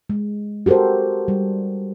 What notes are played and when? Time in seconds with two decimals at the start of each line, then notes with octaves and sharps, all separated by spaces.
0.10 G#3
0.66 F#4 G4 A4 A#4 C5
1.28 G3